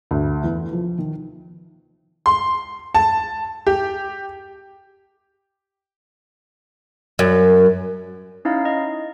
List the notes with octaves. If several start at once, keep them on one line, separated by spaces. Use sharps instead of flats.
D2
E2
F3
D#3
C6
A5
G4
F#2
C#4 D#4 E4 F5
D#5